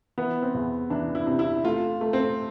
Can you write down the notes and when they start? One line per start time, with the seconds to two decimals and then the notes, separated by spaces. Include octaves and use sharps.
0.18 E3 B3
0.42 C4
0.54 E2
0.90 E3 D4
1.15 E4
1.27 C3
1.39 E4
1.64 A3 F4
2.01 A3
2.13 C4